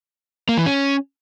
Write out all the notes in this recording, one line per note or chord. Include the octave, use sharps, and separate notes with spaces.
A#3
E3
C#4